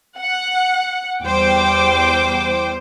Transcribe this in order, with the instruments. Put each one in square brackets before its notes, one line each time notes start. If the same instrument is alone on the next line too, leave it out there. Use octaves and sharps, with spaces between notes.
[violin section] F#5
[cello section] E2 G3 C5 [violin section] G5 D6